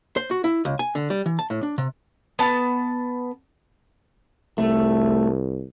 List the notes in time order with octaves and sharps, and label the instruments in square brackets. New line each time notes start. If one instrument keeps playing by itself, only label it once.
[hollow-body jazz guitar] C5
F#4
E4
C#2
G#5
D3
G3
E3
A5
A2
D4
C3
[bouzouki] B3 A5
[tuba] C2 [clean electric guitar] A3